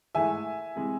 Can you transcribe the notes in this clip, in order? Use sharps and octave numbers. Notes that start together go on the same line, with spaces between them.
G#2 E3 A3 E5 G#5
C3 E3 G#3